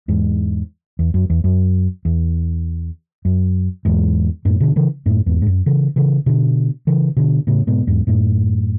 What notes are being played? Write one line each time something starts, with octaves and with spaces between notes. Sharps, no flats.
E2 G#2
E2
F#2
E2
F#2
E2
F#2
E2 G#2
F#2 A2
B2 D3
C#3 E3
F#2 A2
E2 G#2
G#2
F#2
C#3 E3
C#3 E3
B2 D3
C#3 E3
B2 D3
A2 C#3
G#2 B2
E2 G#2
F#2 A2